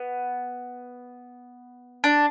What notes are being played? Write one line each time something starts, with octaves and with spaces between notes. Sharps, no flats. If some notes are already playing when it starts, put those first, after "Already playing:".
Already playing: B3
D4